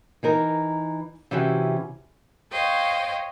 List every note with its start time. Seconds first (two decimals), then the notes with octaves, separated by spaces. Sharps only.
0.23 E3 D#4 A#4
1.31 C3 E3 C#4 F#4 G4
2.52 C5 C#5 D#5 F5 G5